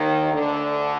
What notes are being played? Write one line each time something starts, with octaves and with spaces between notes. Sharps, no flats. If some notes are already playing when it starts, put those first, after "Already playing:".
Already playing: D#2 D#3
D2 D3